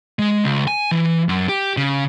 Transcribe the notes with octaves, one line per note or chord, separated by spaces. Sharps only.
G#3
C#2
G#5
E3
F#2
G4
C#3